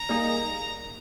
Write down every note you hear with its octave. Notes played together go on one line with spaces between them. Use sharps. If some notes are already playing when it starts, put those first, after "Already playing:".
Already playing: A#5
G3 A#3 D#4 G#4 D#5